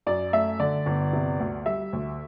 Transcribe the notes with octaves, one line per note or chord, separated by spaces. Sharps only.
F#2 D5
A3 E5
D3 D5
G1
C3
D2
G3 E5
D2